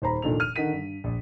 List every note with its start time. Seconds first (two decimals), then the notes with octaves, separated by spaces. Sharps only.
0.02 D#1 C5 A#5 B5
0.22 F1 A#2 D#3 D4 A4 F7
0.40 F6 D#7
0.56 D3 D#3 F#5 B6 D#7
0.73 G2
1.04 A#1